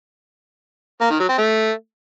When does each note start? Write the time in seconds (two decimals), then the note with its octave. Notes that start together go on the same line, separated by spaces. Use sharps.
1.01 A#3
1.10 D#3
1.20 F#3
1.29 C4
1.38 A3